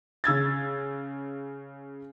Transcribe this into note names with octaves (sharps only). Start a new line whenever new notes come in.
C#3 E6 G#6 A6